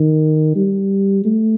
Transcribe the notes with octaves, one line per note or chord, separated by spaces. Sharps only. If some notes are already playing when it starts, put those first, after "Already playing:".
Already playing: D#3
G3
A3